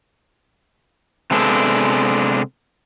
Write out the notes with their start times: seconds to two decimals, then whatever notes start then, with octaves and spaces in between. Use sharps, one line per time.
1.31 C3 G#3 B3 D4 A4 C5